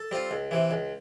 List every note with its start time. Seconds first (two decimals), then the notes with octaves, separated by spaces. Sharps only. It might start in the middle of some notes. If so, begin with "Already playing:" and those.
Already playing: A4
0.11 G3 C4 F4
0.31 C#2
0.51 C3 E3
0.71 C#2